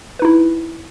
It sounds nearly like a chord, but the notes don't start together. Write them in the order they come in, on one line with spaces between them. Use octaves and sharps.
B4 D#4 E4